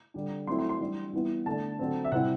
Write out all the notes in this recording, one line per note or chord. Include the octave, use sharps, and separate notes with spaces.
D3 G3 D4
F#3 A3 C4 E4 C6
C6
C6
E3 G3 D4
E3 G3 B3 E4
D3 A3 D4 A5
D3 F#3 C4
E5
C3 G3 C4 E4 F#5